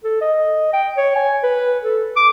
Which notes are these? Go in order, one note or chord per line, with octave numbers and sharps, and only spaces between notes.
A4
D#5
G5
C#5
G#5
B4
A4
D6